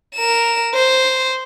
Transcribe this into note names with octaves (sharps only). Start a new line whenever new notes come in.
A#4 E7
C5